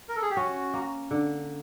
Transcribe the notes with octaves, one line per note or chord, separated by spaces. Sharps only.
A#4
A4
G#4
G4
C#4 F#4
A#3
D3